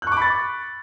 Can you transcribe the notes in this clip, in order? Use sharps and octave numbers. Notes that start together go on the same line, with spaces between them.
B5 C#6 D6 F#6 A6